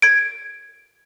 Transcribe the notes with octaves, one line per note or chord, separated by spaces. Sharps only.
G#6 D7